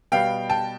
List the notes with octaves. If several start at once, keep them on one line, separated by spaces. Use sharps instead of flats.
B2 G3 B3 F5 G5
G5 A5